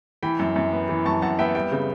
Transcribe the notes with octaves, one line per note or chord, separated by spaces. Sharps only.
E3 G5 B5
F#2
F#2
B3
E3
F#2 A5 C#6
F#2 F#5 A5
B3 E5 G5
G3 E5 G5
C#3